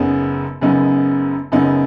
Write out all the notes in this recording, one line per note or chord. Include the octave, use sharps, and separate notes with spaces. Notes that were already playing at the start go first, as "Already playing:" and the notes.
Already playing: F#1 F#2 C#3 B3 D#4
F#1 F#2 C#3 B3 D#4
F#1 F#2 C#3 B3 D#4